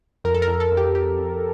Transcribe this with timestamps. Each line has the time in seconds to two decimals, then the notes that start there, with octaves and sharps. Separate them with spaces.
0.24 F2 A#4
0.34 A4
0.42 A#4
0.47 F2
0.60 A4
0.72 F2
0.77 G4
0.95 F2 G4
1.19 F2